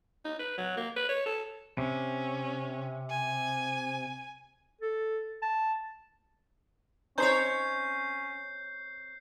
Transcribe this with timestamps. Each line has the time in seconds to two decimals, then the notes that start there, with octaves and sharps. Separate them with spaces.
0.25 D#4
0.39 B4
0.58 F#3
0.77 A#3
0.96 B4
1.09 C#5
1.26 A4
1.78 C3 C#4
3.10 G#5
4.81 A4
5.42 A5
7.18 C4 C#4 D#4 G#4 C5 C#5 G6 C7